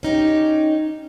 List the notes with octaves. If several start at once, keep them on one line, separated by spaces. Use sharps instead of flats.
C#4 D#4 G4